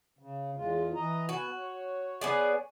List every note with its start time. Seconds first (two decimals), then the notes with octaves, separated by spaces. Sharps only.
0.19 C#3
0.57 E2 G#3 F4
0.95 E3 D#5 A#5
1.29 B3 F#4 G#5
1.57 C#5
2.21 B3 G#4 D5